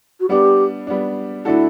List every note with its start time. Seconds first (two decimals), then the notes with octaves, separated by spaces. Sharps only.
0.20 F#4
0.29 G3 B3 D4 G4
0.87 G3 B3 D4
1.45 D3 A3 D4 E4 F#4 A4